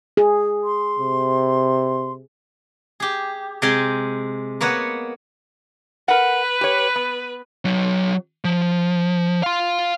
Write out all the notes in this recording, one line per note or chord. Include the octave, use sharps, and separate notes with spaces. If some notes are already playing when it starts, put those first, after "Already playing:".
G#4
C6
C3
G4 G#4
C3 G#3 G#4 G5 G#5 C6
A#3 B3 C#5 D#5 F#5
A#4 B4 F#5
G4 C#5
B3
F#3 D#4
F3
F5 C6